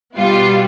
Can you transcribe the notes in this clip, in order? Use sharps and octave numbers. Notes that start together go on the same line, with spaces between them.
B2 G3 B3 F4